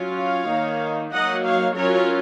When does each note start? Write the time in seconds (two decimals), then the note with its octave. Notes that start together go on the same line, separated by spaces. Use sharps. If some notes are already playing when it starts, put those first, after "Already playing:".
Already playing: F#3 C#4 F4
0.17 C#5 F5
0.49 D#3 A#3 D#4
1.13 F#3 A#3 D#4 D#5 F#5
1.45 C#5 F5
1.76 F#3 C#4 F4 A#4 C#5